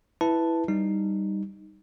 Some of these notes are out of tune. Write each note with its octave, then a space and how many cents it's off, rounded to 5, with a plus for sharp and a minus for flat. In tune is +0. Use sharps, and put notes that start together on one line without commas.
E4 +0 B4 +0 A5 +0
G3 +0 D#4 -5